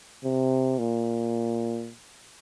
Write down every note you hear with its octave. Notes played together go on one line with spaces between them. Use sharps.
C3
A#2